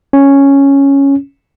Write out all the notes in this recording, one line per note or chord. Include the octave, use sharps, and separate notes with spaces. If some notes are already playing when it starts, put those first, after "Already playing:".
C#4